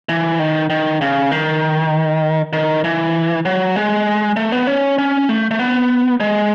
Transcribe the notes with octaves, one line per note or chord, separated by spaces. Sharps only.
E3
D#3
D#3
C#3
D#3
D#3
E3
F#3
G#3
A3
B3
C#4
C#4
A3
A3
B3
G#3